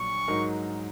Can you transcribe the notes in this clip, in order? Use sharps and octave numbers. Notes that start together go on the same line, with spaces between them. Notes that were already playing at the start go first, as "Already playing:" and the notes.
Already playing: A#1 A#2 F#3 C#6
G#2 F#3 D#4 A#4